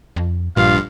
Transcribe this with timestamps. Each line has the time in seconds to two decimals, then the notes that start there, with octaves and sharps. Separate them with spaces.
0.16 F2
0.56 A#1 G2 A#2 F4 F5